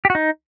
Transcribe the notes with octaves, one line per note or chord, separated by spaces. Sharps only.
G4
F#4
D#4